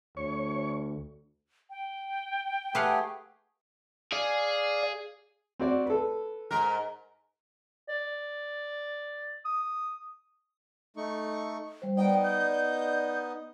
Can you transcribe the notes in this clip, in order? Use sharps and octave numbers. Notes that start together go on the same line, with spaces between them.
D2 C#5 C#6
G5
A3 G4 G#4 B4 F5 F#5
G#4 D5 F5
C4 F#4 D5
A4 B4
G#2 A#4
D5
D#6
A3 D#4 C#6
G3 C5
B3 D#4 D5 D#5 G5
G6